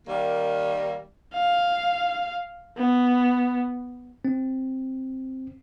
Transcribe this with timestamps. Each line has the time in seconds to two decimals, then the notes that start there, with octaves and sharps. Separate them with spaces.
0.08 D#3 G3 A#3
1.34 F5
2.77 B3
4.25 C4